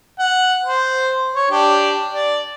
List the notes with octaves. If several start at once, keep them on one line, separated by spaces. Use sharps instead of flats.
F#5
C5
C#5
D4 G4
D5